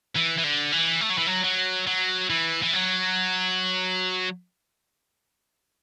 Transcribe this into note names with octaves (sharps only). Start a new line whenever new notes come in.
E3
E3
D3
E3
A3
F#3
E3
F#3
F#3
F#3
E3
E3
F#3